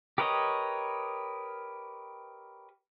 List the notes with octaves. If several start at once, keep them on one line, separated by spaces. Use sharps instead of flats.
G4 A#4 B4 C#5 D#5